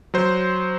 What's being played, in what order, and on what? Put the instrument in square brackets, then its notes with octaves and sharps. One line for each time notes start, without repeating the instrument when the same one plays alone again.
[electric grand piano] F#3 C5